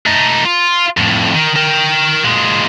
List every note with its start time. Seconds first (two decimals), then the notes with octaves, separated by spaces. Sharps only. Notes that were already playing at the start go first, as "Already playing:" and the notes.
0.06 A3 D#4
0.45 F4
0.97 F2 A2
1.35 D#3
1.56 A#4 G5
2.24 A#2 G#3